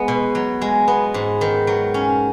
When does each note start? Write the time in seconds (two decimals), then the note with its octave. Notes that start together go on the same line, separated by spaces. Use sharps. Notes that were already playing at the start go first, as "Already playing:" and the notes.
Already playing: G#3 B3
0.08 B2
0.35 F#3
0.62 G#3
0.88 B3
1.14 G#2
1.41 D#3
1.67 F#3
1.94 C#4